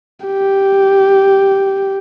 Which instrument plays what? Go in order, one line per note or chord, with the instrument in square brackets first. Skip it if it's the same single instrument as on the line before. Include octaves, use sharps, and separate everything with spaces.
[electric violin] G4